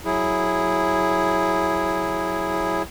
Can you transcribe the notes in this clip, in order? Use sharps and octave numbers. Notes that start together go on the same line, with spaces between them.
F#3 E4 G#4